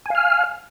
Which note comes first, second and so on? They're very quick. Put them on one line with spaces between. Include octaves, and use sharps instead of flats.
G#5 F5 F6